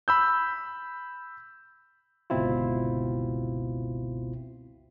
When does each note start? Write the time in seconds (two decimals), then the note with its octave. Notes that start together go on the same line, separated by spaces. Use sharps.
0.08 B5 E6 G6
2.30 G1 C#2 B2 C4 E4 F4